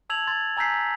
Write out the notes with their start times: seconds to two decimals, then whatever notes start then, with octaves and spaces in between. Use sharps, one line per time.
0.10 A5 E6 G#6 F7 F#7
0.27 C6 G#6 A6
0.57 G#5 A#5 E6 G6 B6 C7